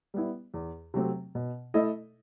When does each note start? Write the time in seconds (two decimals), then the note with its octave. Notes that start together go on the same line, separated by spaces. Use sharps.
0.14 G3 B3 E4
0.54 E2
0.94 C3 F#3 A3 C4
1.35 B2
1.74 A3 E4 A4 D#5